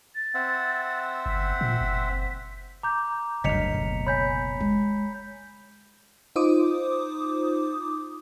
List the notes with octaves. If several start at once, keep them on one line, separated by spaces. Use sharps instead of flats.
A6
C4 E5 F#5
G1 B6
A#2
F#1
A#5 D6 G6
F#1 D2 G2 D#5 B6 C#7 F7
B2
C#5 G#5 B5 G6 B6
G#3
D#4 F4 C5 D6 D#6